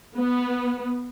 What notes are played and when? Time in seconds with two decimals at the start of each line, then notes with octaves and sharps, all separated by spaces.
0.16 B3